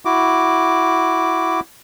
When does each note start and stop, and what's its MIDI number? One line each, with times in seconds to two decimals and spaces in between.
0.05 1.60 64
0.05 1.60 66
0.05 1.60 86